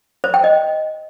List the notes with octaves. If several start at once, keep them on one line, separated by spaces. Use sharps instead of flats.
C5
G5
D#5